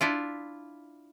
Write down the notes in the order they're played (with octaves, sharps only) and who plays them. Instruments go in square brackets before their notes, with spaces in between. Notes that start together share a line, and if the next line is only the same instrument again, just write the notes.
[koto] D4 E4 F4